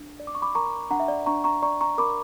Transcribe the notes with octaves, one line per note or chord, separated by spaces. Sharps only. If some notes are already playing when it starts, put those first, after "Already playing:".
Already playing: D4
D5
D6
C#6
B5 D6
A#4 A#5 C#6
D4 F#5 A#5
E5
D5
D4 A#5 C#6
A#5 C#6
D5 A#5 C#6
A#5 C#6
A#4 B5 D6